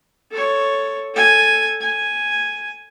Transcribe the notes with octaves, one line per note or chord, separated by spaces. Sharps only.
A4 C#5
A4 G#5
G#5